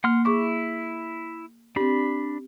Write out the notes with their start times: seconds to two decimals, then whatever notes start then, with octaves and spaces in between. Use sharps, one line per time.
0.04 A#3 F#5 C6 F6
0.25 E4 G#4 C#6 D6
1.76 C4 D4 G4 B5